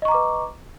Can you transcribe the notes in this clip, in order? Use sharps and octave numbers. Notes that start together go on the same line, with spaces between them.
B4 D#5 A#5 C#6 D6